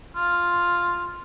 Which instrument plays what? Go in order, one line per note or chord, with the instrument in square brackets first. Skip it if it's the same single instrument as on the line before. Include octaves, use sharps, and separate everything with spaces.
[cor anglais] F4